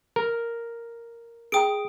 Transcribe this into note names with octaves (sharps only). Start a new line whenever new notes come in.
A#4
G#4 G5 A#5 D#6 D7